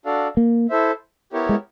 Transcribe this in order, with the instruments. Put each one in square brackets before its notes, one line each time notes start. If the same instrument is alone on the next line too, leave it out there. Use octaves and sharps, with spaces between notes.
[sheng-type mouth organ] D4 F#4 A4 D5 F5
[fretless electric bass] A#3
[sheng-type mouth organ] E4 A4 C5 E5
B3 E4 G4 A#4 C#5
[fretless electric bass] G#3